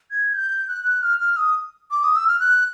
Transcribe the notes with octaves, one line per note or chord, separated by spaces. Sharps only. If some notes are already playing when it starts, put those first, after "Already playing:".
G#6
G6
F#6
F6
F6
D#6
D6
D#6
E6
F6
F#6